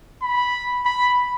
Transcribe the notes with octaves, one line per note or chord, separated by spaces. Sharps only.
B5
B5